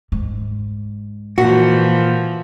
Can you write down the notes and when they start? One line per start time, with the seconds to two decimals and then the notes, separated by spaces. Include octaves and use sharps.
0.12 G#2
1.38 A#2 E3 F3 F#4